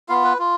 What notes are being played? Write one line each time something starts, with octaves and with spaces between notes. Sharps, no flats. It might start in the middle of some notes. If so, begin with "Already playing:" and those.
B3 F4 F5
B4
F4